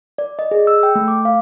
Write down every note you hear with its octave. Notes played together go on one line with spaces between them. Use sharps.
D5
D#5
G#4
E6
G5
A3
D6
F5